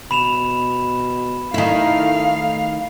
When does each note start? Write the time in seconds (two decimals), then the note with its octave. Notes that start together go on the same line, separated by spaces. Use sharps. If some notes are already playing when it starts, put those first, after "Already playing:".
0.11 B2 B5 E7 F7
1.54 D#3 A3 E4 F5